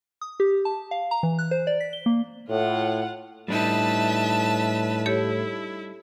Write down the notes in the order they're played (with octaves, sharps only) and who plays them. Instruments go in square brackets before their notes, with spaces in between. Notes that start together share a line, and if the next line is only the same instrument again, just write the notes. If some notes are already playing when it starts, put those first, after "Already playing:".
[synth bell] D#6
G4
A5
F5
A#5
E3
F#6
C5
D5
B6
G7
A#3
[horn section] A2 [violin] F4 F#5
[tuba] A2 [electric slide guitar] G3 D4 D#4 [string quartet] B4 E5 A5
[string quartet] E4 [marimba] G4 A4 C#5